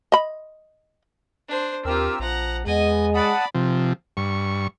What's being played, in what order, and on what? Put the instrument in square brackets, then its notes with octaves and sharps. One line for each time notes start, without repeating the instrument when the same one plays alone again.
[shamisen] D#5 B5
[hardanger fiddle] D4 C5
[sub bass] D#2 [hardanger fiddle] C4 F4 [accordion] G4 A#4 E6
[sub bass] A#1 [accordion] F3 [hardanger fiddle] F#5 A#5
[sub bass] E2 [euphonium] G#3 [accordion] B3 [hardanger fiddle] D#5 G#5
[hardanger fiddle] D5 B5 [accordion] F#5 A5 D#6
[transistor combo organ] C3 F3
G2 C#6